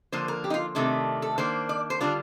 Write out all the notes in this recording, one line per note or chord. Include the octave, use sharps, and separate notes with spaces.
D3 F3 A#3 C5
A#4
G4
D#4
F4
C3 D#3 A3 D4
A4
D#3 A#3 D4 C5
D5
C5
D3 G3 D4 F4